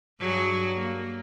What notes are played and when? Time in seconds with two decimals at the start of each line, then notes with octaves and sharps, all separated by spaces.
0.20 G2 F#3 G#4
0.75 A#3